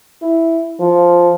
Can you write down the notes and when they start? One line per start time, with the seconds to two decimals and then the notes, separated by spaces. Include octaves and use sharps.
0.22 E4
0.80 F3